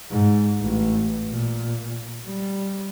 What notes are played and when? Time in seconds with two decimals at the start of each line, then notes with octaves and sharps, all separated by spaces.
0.10 G#2
0.60 A1
1.30 A#2
2.26 G3